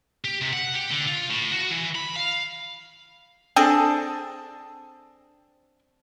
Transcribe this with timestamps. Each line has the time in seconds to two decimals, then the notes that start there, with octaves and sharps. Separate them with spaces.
0.24 G4
0.41 C3
0.53 F#5
0.76 G4
0.91 D3
1.07 F4
1.30 A2
1.52 F#4
1.71 E3
1.95 B5
2.16 F5
3.56 C4 D4 G#4 A4